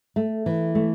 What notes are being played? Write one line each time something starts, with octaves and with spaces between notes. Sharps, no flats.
A3
E3
A3